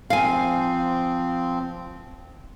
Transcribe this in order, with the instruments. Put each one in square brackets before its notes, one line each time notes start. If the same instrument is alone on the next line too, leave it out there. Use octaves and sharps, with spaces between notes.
[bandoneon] F3 C4 [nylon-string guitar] F5 G#5